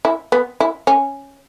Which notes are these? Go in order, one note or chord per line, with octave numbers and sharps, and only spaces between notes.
E4
B3
E4
C#4